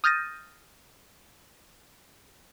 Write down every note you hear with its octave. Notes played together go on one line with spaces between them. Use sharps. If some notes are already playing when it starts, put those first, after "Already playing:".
D#6 F6 G6 A6 A#6 D#7